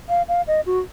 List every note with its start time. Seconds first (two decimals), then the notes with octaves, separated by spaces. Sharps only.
0.09 F5
0.28 F5
0.47 D#5
0.66 F#4